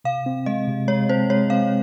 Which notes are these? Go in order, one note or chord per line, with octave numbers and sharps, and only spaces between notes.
C3 F5
C4
G#3 D#5
C3
G#3 C#5
C4 C5
G#3 C#5
C4 F5